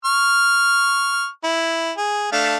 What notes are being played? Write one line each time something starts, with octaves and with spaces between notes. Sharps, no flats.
C#6 F6
E4
G#4
A3 D4 F5